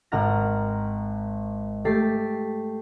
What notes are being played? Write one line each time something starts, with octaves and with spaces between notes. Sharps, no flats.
G#1 F#5 A#5 F6 A#6
A3 G4 A6 B6 C7